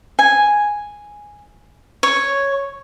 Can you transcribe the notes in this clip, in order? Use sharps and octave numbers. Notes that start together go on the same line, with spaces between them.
G#5
C#5